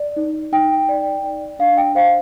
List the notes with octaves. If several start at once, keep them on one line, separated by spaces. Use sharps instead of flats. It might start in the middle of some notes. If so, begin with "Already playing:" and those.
Already playing: D5
D#4
D#4 G5
D5
D5
D4 F5
G5
C5 F5